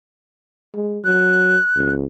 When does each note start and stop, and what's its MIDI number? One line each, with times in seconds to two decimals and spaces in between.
0.74 0.99 56
1.05 1.57 54
1.05 1.91 90
1.76 2.05 37